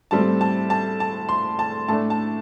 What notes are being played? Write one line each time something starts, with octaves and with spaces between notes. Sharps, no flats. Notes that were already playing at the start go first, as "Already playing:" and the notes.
A2 G3 C4 A5
A5
A5
A5
C6
A5
A2 A3 D4 A5
A5